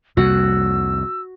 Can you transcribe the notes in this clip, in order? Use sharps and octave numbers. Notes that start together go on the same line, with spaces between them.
C2 F2 C3 G3 A#3 F#4 F#5 E6